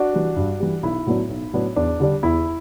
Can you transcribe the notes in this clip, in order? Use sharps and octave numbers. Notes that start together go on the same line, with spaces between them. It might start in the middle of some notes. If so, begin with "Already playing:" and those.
Already playing: D4 F#4
E3 G3
G2
E3 G3
B1 E4
A2 F#3 B3 D4
B1
A2 F#3 B3 D4
E2 D4
D3 G3 D4
E2 E4